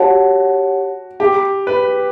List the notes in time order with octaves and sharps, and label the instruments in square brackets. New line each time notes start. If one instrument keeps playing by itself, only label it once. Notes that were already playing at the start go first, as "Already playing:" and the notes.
Already playing: [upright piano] F#4 [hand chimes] G4 C#5 F#5 A5
[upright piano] G4
B4